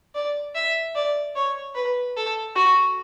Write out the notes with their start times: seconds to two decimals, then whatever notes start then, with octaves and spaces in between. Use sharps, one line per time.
0.15 D5
0.55 E5
0.95 D5
1.36 C#5
1.75 B4
2.16 A4
2.55 F#4